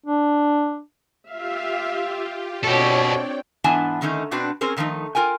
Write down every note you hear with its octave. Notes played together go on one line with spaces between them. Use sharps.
D4
F4 G4 E5 F5
B2 C4 D4 G4 A4 C#5 D5 G5
G#2 E3 B3 D4 G#5 A5
D3 D#3 A3 C#4 D#4
B2 C4 D4 F#4 B4 D5
C4 C#4 G#4 A#4 C5
D3 D#3 F3 A3 D#4
F4 A#4 G5 G#5